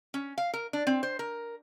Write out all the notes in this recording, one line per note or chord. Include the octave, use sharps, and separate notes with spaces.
C#4
F5
A#4
D4
C4
C5
A#4